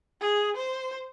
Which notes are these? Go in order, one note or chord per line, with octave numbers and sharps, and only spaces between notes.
G#4
C5